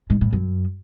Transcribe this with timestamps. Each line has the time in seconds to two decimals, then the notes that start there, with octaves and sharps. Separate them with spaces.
0.10 G#2
0.21 A2
0.33 F#2